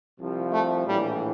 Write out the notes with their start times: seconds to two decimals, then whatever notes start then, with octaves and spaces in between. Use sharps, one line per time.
0.20 C2 C3 F3
0.53 A3
0.86 A#1 A2 E3 G3